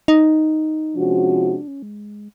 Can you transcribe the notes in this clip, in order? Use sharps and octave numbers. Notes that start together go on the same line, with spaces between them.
D#4
C3 F3 G#3 C#4 D4 F#4
D#4
D4
C#4
G#3